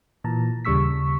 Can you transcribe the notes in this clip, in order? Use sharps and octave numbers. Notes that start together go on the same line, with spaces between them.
A#2 E3 A5 A#5
D#2 C#3 G3 C#6 E6 B6